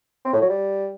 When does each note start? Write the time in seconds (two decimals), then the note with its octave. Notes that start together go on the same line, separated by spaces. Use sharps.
0.25 C4
0.33 A2
0.41 F#3
0.49 G3